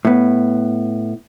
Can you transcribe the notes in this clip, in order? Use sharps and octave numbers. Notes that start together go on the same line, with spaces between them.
A2 B3